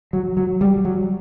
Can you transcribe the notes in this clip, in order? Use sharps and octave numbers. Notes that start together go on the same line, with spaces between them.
F#3
F#3
G3
F#3